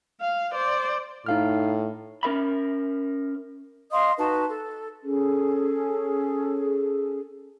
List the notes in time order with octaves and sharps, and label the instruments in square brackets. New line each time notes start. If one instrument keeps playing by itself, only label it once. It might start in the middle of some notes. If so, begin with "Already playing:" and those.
[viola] F5
C5 D5
[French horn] A2 [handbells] D#4 F5 F6
[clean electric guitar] C#4 A#4 E5 B5
[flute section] D#5 F5 C6 D#6
D#4 F#4 B4 A5
A4
C#4 G#4 A4